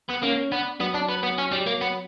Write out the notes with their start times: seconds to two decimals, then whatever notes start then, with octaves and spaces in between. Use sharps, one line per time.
0.09 B3
0.22 A#3 C#4
0.51 B3 D4
0.80 F#3 B3
0.94 D4
1.09 B3
1.23 B3
1.38 C#4
1.52 G3
1.67 A#3
1.81 B3